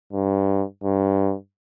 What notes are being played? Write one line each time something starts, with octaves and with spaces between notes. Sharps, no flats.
G2
G2